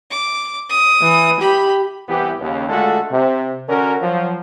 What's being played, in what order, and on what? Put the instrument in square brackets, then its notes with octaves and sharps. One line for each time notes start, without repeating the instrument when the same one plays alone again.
[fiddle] D6
D#6
[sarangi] E3
[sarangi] G4 [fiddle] B5
[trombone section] C2 E3 B3 G4
D#2 C#3
D3 G#3 A3 F4 F#4 A4
C3
D3 C#4 F#4 A#4
F3 F#3